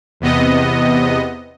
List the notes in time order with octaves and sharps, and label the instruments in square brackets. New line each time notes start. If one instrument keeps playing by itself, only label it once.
[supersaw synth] E2 C3 B3 D#5